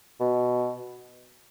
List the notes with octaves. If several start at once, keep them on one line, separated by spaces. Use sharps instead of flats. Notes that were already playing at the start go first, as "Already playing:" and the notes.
B2